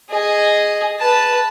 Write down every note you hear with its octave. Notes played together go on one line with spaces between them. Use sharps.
G#4 D#5
B4 A5